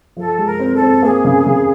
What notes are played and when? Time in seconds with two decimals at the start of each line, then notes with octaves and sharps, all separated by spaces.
0.17 F3 A4
0.38 G#3
0.46 A#4
0.59 C4
0.74 A4
0.81 C4
1.02 A#3 G#4
1.25 C#3
1.46 C#3